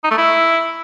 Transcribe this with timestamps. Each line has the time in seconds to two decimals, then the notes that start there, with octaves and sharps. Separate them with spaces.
0.04 D#4
0.11 A3
0.18 E4